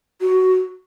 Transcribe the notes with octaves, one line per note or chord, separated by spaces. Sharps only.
F#4